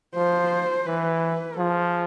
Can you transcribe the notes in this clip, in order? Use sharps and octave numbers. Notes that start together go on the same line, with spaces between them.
F3 C5
E3 B4
F3 G#4